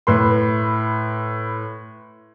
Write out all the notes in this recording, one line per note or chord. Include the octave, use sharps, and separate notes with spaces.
A2 B4 C6